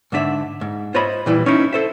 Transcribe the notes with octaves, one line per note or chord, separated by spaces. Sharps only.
G#2 D3 D4 E5
G#2
F4 C5 C#5 D#5 E5 B5
A#2 E3 G3 E4
C#4 D#4 E4
A4 C5 E5